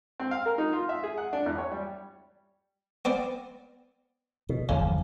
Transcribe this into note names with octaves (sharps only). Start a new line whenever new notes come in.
C4
F5
A#4
D#4
F4
E5
G#4
F#5
D4
E2
C#5
G3
B3 C4 D5
B2
G1 E2 C#3 F3